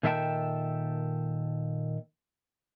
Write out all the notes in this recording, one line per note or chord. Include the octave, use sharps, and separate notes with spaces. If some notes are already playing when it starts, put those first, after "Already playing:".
A#2 D#3 A4 E5 G5 A5